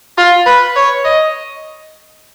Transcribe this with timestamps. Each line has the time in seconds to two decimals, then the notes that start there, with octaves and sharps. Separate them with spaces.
0.18 F4
0.46 B4
0.76 C#5
1.05 D#5